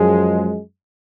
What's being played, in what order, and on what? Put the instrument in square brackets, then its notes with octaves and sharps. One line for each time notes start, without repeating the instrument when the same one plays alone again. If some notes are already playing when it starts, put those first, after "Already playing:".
Already playing: [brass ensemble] F#2 F3 G#3